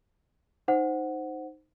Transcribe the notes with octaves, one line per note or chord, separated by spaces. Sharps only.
D#4 C5 F#5